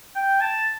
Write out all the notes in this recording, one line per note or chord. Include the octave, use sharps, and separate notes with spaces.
G5
A5